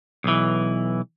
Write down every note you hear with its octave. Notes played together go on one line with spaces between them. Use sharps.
B1 E3